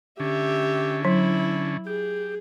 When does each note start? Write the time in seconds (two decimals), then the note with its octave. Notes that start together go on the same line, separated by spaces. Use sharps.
0.20 D3 C#4 G4 E5
1.05 F#3 E4
1.87 G4 G#4